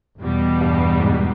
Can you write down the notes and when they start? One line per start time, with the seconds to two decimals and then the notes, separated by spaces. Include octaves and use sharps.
0.20 E2 B2 G3
0.61 G2
1.00 G#2